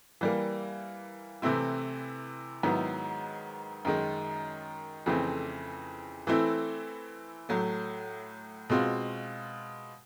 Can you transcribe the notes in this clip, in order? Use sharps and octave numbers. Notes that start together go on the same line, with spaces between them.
E3 G3 A#3
C3 E3 A3 C4 E4
G#2 D#3 F#3 B3 E4
F#2 D#3 G#3
F2 C#3 E3 A3 C4
E3 A3 C4 E4
A2 F#3 A3
B2 G#3 C4 F4